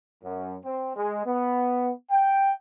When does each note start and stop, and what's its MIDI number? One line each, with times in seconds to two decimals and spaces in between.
0.24 0.56 42
0.64 0.95 60
0.96 1.25 56
1.26 1.92 59
2.11 2.52 79